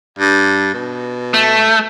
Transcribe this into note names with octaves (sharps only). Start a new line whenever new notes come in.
G2
B2
A3